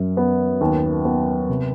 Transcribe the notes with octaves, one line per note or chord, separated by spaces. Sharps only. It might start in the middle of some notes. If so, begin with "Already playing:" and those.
Already playing: F#2
B3
D#2
B3
C3